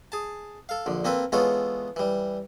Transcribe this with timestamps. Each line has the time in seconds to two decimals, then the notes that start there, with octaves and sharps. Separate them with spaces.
0.12 G#4 A5
0.69 A4 F5
0.86 A#1 D3
1.05 A#3 C4 A4 B4
1.32 E3 G#3 B3 F4 A4 C#5
1.96 E3 G3